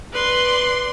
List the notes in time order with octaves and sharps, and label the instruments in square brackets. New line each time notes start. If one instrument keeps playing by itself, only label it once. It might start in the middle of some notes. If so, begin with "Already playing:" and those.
[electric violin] B4 [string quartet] D5 C6